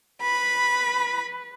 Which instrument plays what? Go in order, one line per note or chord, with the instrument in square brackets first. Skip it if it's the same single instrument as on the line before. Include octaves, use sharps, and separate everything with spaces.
[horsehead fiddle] B4 [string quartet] B5